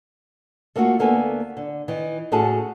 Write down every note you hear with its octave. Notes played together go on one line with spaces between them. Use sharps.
A3 A#3 C#4 F4 F#4
D2 A#3 B3 A4 G#5
D3
D#3 E3
A2 C#4 F#4 G#4 A4 A5